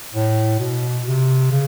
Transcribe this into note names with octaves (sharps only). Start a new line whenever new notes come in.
A2
B2
C3
C#3